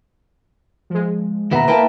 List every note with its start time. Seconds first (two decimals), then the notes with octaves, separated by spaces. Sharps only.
0.90 F3 G#3
1.51 D#2 B2 B3 E5 A#5
1.68 A#3 E4 B4 G5 A5